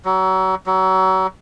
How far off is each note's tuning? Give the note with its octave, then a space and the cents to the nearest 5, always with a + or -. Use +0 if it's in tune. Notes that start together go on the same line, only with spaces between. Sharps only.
F#3 +30
F#3 +30